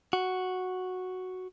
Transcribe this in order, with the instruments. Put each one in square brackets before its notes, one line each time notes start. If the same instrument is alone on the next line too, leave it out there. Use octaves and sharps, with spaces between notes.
[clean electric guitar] F#4